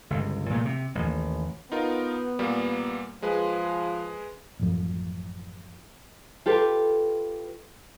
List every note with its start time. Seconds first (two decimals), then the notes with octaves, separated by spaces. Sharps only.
0.10 G1 C#2
0.50 A#2 C#3 F3 A3
0.65 C3
0.95 A1 D#2
1.72 B3 D#4 F4 A#4
2.39 A#2 G3 A#3
3.22 F3 G#3 G#4 B4
4.60 A1 F#2 F3
6.46 F4 G4 A4 B4